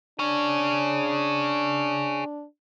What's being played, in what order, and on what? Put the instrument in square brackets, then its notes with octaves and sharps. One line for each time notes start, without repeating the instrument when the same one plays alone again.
[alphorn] D4 [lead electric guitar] G#4 C#5